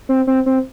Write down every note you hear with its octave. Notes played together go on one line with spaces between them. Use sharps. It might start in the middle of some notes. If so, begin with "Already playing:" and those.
C4
C4
C4